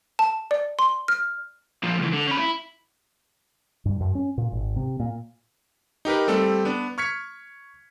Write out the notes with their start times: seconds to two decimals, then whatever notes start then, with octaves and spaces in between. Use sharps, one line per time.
0.19 A5
0.51 D5
0.79 C6
1.08 F6
1.83 A#2 F3
1.99 C#2 E3
2.13 D3
2.27 C#4 B5
2.38 E4
3.85 G2
4.00 F#2
4.15 C#4
4.38 A#2
4.52 G#1
4.76 C3
5.00 A#2
6.05 D#4 G4 A#4 B4
6.28 G3 A3 C4 A4
6.65 B3 D4
6.98 C#6 F6 G#6 B6 C#7